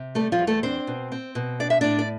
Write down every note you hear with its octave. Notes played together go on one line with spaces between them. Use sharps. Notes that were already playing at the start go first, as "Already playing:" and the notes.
Already playing: C3
G3 A3 A4
F3 F4
E2
A3 A4
C4 D4 C5
B2
C4
B2
D4 D5
E5
A2 D4 D5
D5